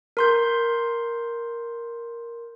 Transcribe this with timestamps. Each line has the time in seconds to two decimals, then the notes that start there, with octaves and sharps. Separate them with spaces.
0.17 A#4 C6 G6